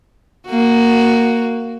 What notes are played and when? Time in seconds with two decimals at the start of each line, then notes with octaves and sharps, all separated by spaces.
0.48 A#3 F#4